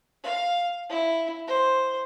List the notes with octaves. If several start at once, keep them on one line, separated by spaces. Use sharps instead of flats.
F5
E4
C5